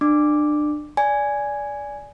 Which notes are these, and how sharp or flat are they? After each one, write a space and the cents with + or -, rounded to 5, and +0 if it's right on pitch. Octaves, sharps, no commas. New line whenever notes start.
D4 +30 D6 +0
D5 -15 G#5 +0